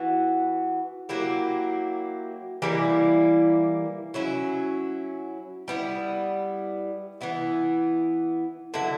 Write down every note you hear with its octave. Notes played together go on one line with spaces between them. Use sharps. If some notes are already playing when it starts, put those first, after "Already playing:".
Already playing: E3 B3 F#4
F#3 A#3 E4 G4
E3 G3 A#3 E4
F#3 C#4 E4
G3 B3 E4
E3 B3 E4
D3 F#3 B3 E4